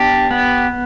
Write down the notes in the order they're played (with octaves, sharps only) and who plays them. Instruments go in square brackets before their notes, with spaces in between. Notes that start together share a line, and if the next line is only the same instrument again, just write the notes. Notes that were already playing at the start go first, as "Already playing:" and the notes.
Already playing: [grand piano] B3 [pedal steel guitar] D4 G4
[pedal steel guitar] B3